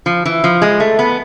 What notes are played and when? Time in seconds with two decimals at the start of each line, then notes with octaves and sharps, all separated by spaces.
0.06 F3
0.25 E3
0.44 F3
0.62 G#3
0.80 A3
0.99 B3